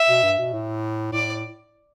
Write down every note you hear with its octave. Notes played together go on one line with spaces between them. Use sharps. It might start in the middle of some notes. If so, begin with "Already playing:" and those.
Already playing: E5
B2
G2
B2
A2
A2 D5